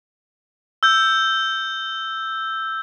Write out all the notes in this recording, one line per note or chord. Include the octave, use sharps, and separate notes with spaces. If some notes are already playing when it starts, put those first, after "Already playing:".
E6 G6